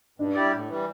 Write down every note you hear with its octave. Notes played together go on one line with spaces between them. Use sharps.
G2 D4
G3 E4 G4 D5
A2
E3 G3